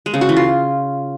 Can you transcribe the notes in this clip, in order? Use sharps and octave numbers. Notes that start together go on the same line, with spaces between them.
G#3
C#3
F#4
E3
F4